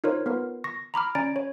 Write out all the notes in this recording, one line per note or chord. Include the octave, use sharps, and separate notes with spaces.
D#4 F4 A#4 C5 C#5
B3 F4 A#4 B4
C#6 A#6
A#5 B5 D6 F6
C#4 D5 G#5 A#5 A6 D7
C#5